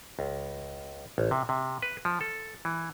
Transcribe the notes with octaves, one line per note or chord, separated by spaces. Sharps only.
C#2
A1
C3
C3
B4
F3
A4
E3